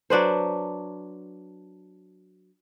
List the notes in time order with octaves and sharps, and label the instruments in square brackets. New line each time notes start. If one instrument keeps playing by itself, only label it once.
[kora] F#3 D4 B4 C5